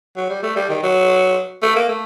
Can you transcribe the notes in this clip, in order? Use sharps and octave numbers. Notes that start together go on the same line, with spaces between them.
F#3
G3
A3
G3
D#3
F#3
A3
A#3
A3